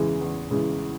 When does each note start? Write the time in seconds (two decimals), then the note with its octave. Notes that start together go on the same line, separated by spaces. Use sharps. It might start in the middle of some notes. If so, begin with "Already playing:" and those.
Already playing: E2 C#3 E3 G#3
0.21 E2
0.51 C#3 E3 G#3